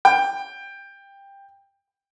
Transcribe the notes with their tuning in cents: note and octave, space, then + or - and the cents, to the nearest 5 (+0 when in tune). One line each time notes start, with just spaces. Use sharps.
G5 +15